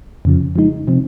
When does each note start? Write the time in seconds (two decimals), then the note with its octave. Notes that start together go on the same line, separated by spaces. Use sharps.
0.25 F2 C#3 F3
0.56 F3 G#3 D#4
0.87 C3 F3 C4